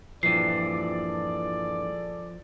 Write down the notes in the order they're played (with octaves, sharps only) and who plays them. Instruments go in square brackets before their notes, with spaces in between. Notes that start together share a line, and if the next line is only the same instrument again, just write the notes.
[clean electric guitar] G2 A#2 E3 [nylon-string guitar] F3 [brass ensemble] G#4 A4 D5 [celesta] C7